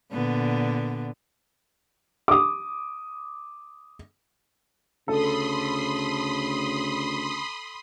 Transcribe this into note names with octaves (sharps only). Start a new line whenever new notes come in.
A#2 D3 B3
D6 D#6
D2 C#3 A4 B5 C6 D#6